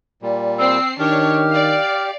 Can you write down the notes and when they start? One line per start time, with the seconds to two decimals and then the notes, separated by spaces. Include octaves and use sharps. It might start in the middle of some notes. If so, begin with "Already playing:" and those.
0.23 A#2 G3
0.59 C4 E6 C7
1.00 D#3 D4 G4 C#5 F6
1.50 D5 F5